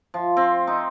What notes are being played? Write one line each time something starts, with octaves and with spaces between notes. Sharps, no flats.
F3
C4
D#4